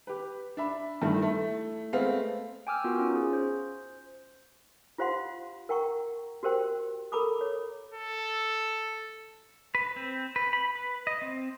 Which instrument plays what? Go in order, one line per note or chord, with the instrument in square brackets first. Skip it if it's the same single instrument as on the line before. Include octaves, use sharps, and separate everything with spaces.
[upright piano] G4 B4
D4 E5 B5
G2 D#3 E3 A3
A3 E4
G#3 A3 B3 C4 F5
[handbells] G5 G#5 D6 E6 F6
B3 F4 F#4 A#4
C#4 D#4 F4
G#4
C5
[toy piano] F4 G4 C5 F5 F#5 C6
A#4 F#5 G5 A#5 C#6
F#4 G4 A#4 C5 G5
A4 A#4 A#5 B5 D6 D#6
C#5
[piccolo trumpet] A4
[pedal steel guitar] B4
C4
B4
B5
B4
D#5
C4